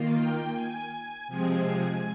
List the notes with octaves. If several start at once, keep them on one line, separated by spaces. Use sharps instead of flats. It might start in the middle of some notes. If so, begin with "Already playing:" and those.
Already playing: D#3 A#3 F4
G5
G#5
C3 F3 G#3 C4 G#5
G#5